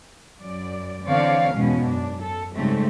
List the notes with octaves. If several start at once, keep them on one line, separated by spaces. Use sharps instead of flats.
F#2 D5
D3 E3 C4 C#5 D5 F5
E2 G#2 B2 G#3 C#4
F#2 D4
A4
G#2 C#3 G3 A3 C4